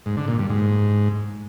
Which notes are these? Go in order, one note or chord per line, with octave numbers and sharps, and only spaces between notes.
G#2
D3
A#2
G2
G#2